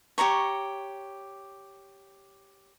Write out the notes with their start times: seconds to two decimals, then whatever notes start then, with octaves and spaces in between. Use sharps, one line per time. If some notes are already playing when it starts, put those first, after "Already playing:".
0.18 G4 C#5 A#5 C#6